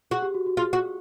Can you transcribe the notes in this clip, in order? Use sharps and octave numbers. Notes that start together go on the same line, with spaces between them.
F#4 G#4
G4
F#4
F#4
F4 G#4
F#4